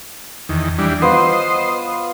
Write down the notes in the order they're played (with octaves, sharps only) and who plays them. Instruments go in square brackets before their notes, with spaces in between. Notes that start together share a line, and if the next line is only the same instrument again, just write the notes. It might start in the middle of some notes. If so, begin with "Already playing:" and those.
[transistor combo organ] E2 D#3
E3 G3 D4
[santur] B3 F4 [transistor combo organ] C5 D#5